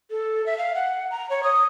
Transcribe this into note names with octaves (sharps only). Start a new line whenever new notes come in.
A4
E5
F5
F#5
A#5
C#5
D#6